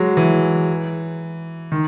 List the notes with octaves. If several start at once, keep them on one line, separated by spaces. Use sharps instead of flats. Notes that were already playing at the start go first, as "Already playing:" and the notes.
Already playing: F#3 G#3
E3
D#3